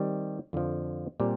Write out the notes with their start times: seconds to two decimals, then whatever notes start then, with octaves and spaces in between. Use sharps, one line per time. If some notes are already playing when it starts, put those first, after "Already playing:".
Already playing: D#3 G3 C4
0.53 F2 D3 F3
1.20 A#2 G3 C4 G4